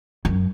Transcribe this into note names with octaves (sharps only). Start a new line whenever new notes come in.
F#2